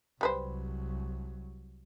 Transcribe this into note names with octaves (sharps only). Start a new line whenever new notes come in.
C2 F#3 G3 B4 C5